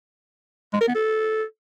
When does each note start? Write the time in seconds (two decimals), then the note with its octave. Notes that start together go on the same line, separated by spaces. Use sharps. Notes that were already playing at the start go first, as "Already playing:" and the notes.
0.73 G#3
0.81 A#4
0.88 B3
0.95 A4